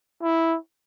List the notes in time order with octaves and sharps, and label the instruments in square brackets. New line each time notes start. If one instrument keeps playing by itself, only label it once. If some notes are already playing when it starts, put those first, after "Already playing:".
[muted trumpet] E4